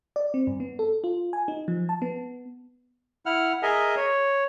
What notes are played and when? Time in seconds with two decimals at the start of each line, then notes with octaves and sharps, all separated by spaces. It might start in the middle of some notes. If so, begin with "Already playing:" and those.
0.16 D5
0.34 C4
0.47 G2
0.60 B3
0.79 A4
1.04 F4
1.33 G#5
1.48 D#4
1.68 F3
1.89 A5
2.02 B3
3.26 E4 F#5 F6
3.63 G#4 A#4 D#5 E5 G#5
3.96 C#5